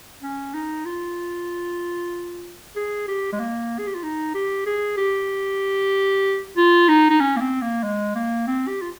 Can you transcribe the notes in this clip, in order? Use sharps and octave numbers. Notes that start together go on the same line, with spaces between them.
C#4
D#4
F4
G#4
G4
G#3
A#3
G#4
G4
F4
D#4
G4
G#4
G4
F4
D#4
D#4
C#4
A#3
C4
A#3
G#3
A#3
C4
G4
F4